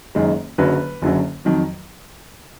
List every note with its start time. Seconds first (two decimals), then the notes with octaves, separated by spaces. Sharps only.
0.15 F#1 F#2 D#3 G#3
0.58 F#1 F#2 D3 F#3 B4
1.02 F#1 F#2 D3 F#3
1.45 F2 D#3 F#3